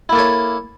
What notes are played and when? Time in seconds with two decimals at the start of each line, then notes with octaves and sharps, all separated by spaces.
0.09 E4
0.12 A#3
0.15 A4
0.19 C#5